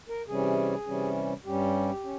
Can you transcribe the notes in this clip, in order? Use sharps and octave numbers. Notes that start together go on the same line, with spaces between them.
A#4
C3 E3 G3 C#4 G#4
C3 E3 G3 C#4
G2 G3 C#4 G4
C#4